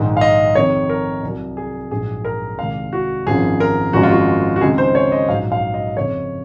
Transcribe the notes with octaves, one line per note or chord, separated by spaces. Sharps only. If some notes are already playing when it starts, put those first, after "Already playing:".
Already playing: A#1 G#2 D#3 G#3
F5
D#5
F2 C3 D#3 C#5
A#4
C2 C3 F#3
G#4
A#1 G#2 F#3 G#4
A#4
C2 C3 D#3 G#3 F5
F#4
G#1 F#2 F3 G#4
A#4
G#1 F#2 F3 G#3 F#4
F4
F#4
F#4
C#2 C3 D#3 G#3 G#4
C5
C#5
D#5
A#1 G#2 F#3 F5
F5
D#5
F#1 F2 C3 C#5